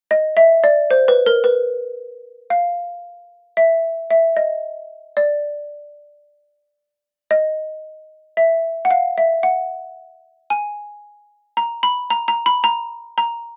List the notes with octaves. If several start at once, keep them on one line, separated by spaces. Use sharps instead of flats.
D#5
E5
D5
C5
B4
A#4
B4
F5
E5
E5
D#5
D5
D#5
E5
F#5
F5
E5
F#5
G#5
A#5
B5
A#5
A#5
B5
A#5
A#5